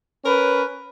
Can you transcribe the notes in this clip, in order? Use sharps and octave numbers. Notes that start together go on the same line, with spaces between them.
C#4 A#4 B4